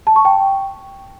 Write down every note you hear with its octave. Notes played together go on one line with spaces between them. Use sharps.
A5
C#6
G5